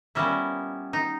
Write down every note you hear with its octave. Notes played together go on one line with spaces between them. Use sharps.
A#2 G3 B3 C#4 E4
D#4